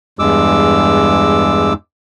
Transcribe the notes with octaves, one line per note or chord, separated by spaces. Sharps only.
E2 G2 G#3 D6 E6